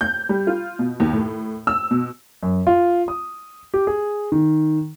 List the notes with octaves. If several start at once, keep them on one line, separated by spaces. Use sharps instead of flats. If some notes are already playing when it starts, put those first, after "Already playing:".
G6
G3
F4
B2
D#2
A2
E6
B2
F#2
F4
D#6
G4
G#4
D#3